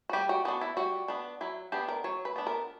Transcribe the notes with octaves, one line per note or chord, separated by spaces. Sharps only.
F#4
G3 G4
F#4
B3 D4 F#4
E4
G3 F#4
B3 D4
F#3 E4
B3 D4 G4
A#4
F#3 C#5
B4
B3 D4
A#4